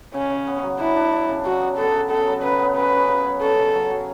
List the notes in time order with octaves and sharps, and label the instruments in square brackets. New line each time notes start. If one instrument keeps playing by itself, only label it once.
[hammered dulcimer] C#3 [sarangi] C#4
[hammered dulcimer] C#3
B3
F#3
[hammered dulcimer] D4 [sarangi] E4
[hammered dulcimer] D4
D4
C#3
[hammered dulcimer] F#3 [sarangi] F#4
[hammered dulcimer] B3
[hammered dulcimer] B3 [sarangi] A4
[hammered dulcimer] C#3
[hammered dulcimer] B3 [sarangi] A4
[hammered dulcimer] F#3
[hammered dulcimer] C#3 [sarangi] B4
[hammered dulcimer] B3
[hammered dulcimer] C#4 [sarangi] B4
[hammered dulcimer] C#4
C#3
F#3
[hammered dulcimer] C#4 [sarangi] A4
[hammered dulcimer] C#3
F#3
F#3